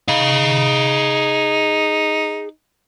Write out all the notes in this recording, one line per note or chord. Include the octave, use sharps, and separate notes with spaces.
D#4 G#4 F5